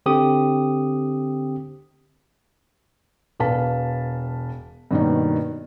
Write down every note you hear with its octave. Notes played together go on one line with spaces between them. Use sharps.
D3 C4 G4 D#6
E1 B4 F5 A5 B6
G2 B2 D#3 A#3 C#4 D#4